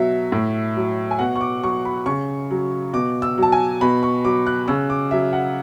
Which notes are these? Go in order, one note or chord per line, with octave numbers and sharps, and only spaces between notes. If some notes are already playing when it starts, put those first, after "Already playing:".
Already playing: B2 F#3 E5
A2
F#3
G#5
B2 F#5
C#6
D6
F#3 C#6
B5
C#3 C#6
F#3
B2 D6
E6
F#3 A5
G#5
B2 B5
C#6
F#3 D6
F#6
C#3 E6
D6
F#3 E5
F#5